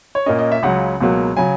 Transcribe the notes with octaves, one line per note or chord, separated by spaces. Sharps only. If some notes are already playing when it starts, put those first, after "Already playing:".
C#5
A#2 A#3 C#4 D#5
D#5
E5
C#2 C#3 F#3 F#5
C#2 B2 F#3 A#3
C#3 F#3 G#5